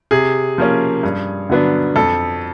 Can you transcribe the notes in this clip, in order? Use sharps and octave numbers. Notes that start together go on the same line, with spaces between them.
C3 G#4
F3 A#3 C#4
G2
D3 F#3 B3 D4
F2 A4